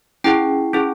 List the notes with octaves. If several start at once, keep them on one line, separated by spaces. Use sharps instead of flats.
C#4 E4 G#4 G5
C#4 E4 G#4